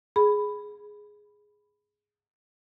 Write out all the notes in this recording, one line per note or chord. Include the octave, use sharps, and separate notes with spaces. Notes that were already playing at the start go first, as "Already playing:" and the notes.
G#4 B5